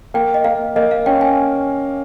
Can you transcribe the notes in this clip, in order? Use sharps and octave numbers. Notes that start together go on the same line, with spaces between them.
A#3 G5
D#5
A#3 F5
A#3 D#5
F5
C#4 G5
G#5